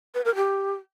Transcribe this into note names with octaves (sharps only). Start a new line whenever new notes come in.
B4
A#4
G4